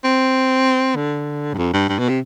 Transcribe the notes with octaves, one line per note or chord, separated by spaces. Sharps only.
C4
D3
G2
F2
G2
G2
B2
C3